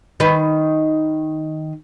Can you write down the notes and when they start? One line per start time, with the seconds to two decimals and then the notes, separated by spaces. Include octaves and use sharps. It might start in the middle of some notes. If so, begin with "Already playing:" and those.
0.20 D#3 B4